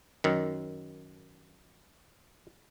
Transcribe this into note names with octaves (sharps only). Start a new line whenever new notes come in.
F#2 D#3